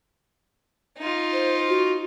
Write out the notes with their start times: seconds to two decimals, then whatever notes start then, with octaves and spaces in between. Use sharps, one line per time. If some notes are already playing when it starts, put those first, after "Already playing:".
0.98 D#4 F4
1.33 C5
1.69 F#4